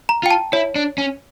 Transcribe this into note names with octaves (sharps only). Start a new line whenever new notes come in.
A#5
F4 G5
A5
E4 C#5
D4
C#4